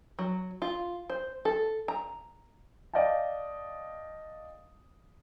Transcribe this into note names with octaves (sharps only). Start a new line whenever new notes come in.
F#3
F4
C5
A4
A#5
D5 D#5 F5 G5 A5